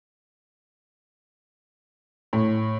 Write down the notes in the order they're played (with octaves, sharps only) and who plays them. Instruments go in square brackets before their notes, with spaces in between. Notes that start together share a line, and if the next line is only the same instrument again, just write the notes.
[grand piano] A2